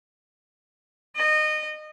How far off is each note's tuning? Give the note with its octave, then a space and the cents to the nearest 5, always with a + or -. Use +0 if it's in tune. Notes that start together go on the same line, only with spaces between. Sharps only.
D#5 -25